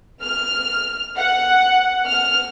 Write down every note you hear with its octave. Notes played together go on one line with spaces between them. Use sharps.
F6
F#5
F6